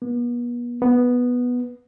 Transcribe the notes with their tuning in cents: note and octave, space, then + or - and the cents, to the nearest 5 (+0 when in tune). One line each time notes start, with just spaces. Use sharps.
B3 -40
B3 -5